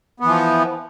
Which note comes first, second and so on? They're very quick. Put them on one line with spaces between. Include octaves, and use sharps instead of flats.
B3 E3 F3